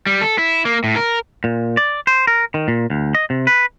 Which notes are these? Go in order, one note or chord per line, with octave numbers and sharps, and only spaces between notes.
G3
A4
E4
A#3
A2
A#4
A#2
D5
C5
A#4
D#3
A#2
D2
D#5
C3
B4